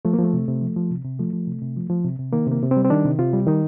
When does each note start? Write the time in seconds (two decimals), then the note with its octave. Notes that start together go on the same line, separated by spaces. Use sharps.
0.05 F3 A3
0.13 A#3
0.19 F3 A3
0.33 C3
0.48 C3
0.61 F3
0.77 F3
0.91 C3
1.05 C3
1.19 F3 A3
1.33 F3
1.48 C3
1.62 C3
1.77 F3
1.90 F3
2.05 C3
2.19 C3
2.33 D#3 A#3
2.47 C3 A#3
2.62 C3
2.71 C4
2.77 G3
2.85 C4
2.90 D#3 D4
3.04 C3
3.18 C3 F4
3.33 G3
3.47 D#3 D#4